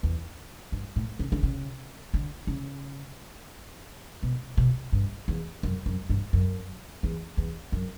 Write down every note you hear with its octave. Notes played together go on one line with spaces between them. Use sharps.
E2
G2
A2
C#3
D3
C#3
D3
C#3
B2
B2
G2
E2
F#2
F#2
G2
F#2
E2
E2
F#2